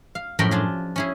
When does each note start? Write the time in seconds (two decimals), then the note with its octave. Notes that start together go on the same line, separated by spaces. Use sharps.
0.15 F5
0.39 F#2 A2 F3 A#4 G5 B5
0.51 D4 F4 G#4
0.96 C#4 E4 G#4